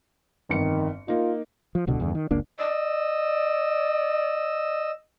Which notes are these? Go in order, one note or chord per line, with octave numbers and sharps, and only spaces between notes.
G1 F2 D#3 C#7
A#3 D#4 F4
F3
D1 C2 B2 D3
E2 G2 D3
D#3
F#1 C#2 A#3 D4
D5 D#5 E6